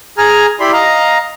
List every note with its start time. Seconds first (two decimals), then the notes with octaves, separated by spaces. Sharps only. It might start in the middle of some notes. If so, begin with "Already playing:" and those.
0.18 G#4 G#5 A#5 F6
0.60 E4 G4 D5 B5 C6
0.73 D#5 F5 A#5